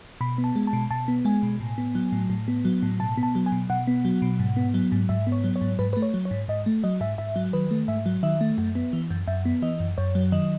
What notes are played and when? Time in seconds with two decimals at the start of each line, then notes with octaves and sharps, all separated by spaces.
0.21 B2 B5
0.38 B3
0.44 A5
0.56 G#3
0.67 A5
0.73 B2
0.91 B2 A5
1.08 B3
1.25 G#3 G#5
1.43 B2
1.60 A2
1.78 B3
1.95 F#3
2.12 A2
2.30 A2
2.48 B3
2.65 F#3
2.83 A2
3.00 B2 A5
3.17 B3
3.23 A5
3.35 F#3
3.46 G#5
3.52 B2
3.70 B2 F#5
3.87 B3
4.05 F#3
4.22 B2
4.40 G#2
4.57 B3
4.74 F#3
4.92 G#2
5.09 G#2 E5
5.27 B3
5.32 C#5
5.44 F#3
5.56 C#5
5.62 G#2
5.79 G#2 B4
5.93 B4
5.97 A3
6.02 C#5
6.14 F#3
6.25 C#5
6.31 G#2
6.48 G#2 D#5
6.66 A3
6.84 F#3 D#5
7.01 G#2 E5
7.18 G#2 E5
7.36 F#3
7.53 D#3 B4
7.71 A3
7.88 G#2 E5
8.06 F#3
8.23 D#3 E5
8.41 A3
8.58 F#2
8.75 B3
8.93 E3
9.10 F#2
9.28 F#2 E5
9.45 B3
9.62 E3 D#5
9.80 F#2
9.98 F#2 C#5
10.15 F#3
10.32 D#3 D#5